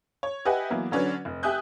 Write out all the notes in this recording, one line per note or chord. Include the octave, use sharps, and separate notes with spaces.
C#5
G4 B4 D#5 E5 F#5 G#5
E3 F#3 A#3 B3
D3 F#3 C#4 D4 B4
F1
G4 E5 G#5 D#6 F#6 G6